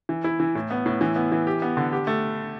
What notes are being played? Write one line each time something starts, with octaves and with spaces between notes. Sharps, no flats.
E3
E4
E3
A2
B3
A2
E3
B3
E3
G4
B3
D3
G4
A3